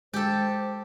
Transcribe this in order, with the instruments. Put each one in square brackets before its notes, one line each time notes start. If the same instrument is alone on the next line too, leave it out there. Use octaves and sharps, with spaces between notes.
[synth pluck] G#3 [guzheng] G4 A4 [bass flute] C5